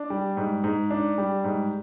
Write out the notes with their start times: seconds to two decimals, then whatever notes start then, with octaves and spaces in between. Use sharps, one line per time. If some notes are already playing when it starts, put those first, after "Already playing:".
Already playing: D4
0.10 G3
0.37 G#2
0.64 G#2
0.91 D4
1.18 G3
1.44 G#2